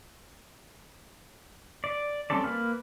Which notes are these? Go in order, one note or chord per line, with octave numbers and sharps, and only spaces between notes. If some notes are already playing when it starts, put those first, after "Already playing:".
D5
G3 C4 C#4 A4 D5
A#3 B4 F6